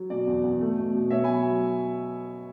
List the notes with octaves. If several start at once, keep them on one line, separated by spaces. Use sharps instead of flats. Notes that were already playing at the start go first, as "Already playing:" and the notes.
Already playing: F#3
B2 D5
E2
E2
A3
B2
B2
B2 C#5 E5
F#3 G#5 B5